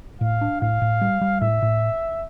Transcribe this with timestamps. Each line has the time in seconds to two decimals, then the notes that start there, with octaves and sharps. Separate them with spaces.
0.21 A2 F5
0.41 D4
0.61 A2 F5
0.82 A2
1.02 G3
1.21 G3
1.41 A2 E5
1.62 A2